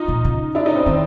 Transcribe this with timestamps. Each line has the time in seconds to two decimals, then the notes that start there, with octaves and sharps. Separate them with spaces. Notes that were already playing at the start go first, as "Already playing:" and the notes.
Already playing: D#4 F4
0.08 A#2
0.25 C#3
0.55 D4 E4
0.66 C#4 D#4
0.76 C4 D4
0.86 D#3 C4 D4